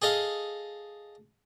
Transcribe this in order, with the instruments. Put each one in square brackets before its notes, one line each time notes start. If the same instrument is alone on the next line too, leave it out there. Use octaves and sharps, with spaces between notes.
[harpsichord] G#4 A4 D#5 F5